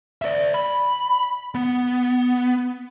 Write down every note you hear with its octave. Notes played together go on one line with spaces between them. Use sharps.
D5 E5
B5
B3